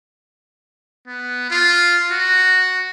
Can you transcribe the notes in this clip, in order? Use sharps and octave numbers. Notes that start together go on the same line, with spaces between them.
B3
F4
F#4